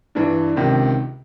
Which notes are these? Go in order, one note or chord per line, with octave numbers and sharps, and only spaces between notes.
G2 E3 D4
C#2 C3 D#3